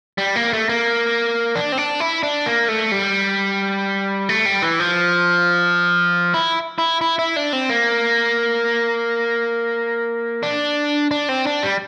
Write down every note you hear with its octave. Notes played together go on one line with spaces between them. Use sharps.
G3
A#3
A3
A#3
D4
C4
D4
E4
D4
A#3
A3
G3
A3
G3
E3
F3
E4
E4
E4
E4
D4
C4
A#3
D4
D4
C4
D4
G3